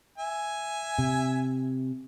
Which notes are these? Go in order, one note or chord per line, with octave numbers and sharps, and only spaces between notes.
E5 G#5
C3